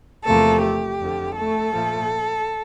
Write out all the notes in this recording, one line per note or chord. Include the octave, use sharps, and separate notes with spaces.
E2 C3 F3 A3 A#3 A4
G4
F2 D3 F3
A3 A4
A#2 F3 A3